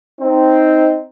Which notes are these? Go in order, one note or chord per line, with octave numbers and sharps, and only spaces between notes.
C4 D#4